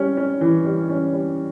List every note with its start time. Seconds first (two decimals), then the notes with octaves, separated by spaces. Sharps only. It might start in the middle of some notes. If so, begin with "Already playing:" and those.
Already playing: G3 C#4
0.17 C#4
0.41 E3
0.65 G3
0.89 C#4
1.13 G3